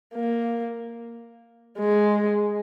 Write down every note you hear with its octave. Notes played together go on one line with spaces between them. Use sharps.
A#3
G#3